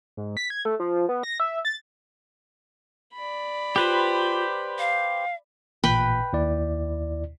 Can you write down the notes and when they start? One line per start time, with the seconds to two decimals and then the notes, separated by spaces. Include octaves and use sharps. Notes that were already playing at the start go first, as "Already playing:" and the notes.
0.17 G#2
0.37 B6
0.50 G#6
0.65 A3
0.80 F3
1.09 B3
1.23 A#6
1.40 E5
1.65 A6
3.14 D5 B5
3.76 F4 G4 B4 C5
4.79 F5
5.84 A1 A#2 B4 G5 B5
6.33 D#2 E4 D5